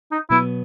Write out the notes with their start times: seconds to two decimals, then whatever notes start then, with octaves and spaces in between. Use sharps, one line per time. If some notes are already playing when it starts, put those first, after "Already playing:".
0.12 D#4
0.30 B2 F#3 B3 E4